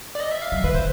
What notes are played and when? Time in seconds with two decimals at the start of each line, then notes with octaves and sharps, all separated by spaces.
0.15 D5
0.20 D#5
0.31 E5
0.42 F5
0.52 F#3 E5
0.64 D3 B4
0.74 D3 C5